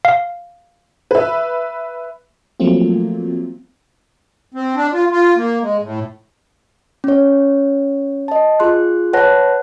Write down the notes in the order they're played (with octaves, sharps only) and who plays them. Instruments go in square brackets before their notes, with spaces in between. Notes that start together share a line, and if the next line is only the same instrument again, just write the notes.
[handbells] F5
[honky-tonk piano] B4 E5
[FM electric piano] F3 F#3 A3 A#3 C4 F4
[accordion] C4
D4
F4
F4
A#3
G#3
A2
[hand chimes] C#4 C#5
D#5 A5
F4 G#4 C6 F#6
B4 C#5 F#5 A5 F#6 A#6